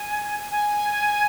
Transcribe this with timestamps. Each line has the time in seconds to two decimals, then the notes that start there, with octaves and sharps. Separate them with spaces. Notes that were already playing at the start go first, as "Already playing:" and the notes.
Already playing: G#5
0.51 G#5